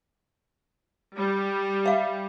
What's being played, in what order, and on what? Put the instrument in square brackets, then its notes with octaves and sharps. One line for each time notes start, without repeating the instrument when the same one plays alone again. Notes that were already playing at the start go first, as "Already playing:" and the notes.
[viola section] G3
[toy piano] E5 F5